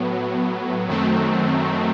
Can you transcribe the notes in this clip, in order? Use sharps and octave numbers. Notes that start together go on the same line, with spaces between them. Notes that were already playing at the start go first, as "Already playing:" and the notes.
Already playing: A2 F#3 B3
F#2 D#3 F#3 A3 C4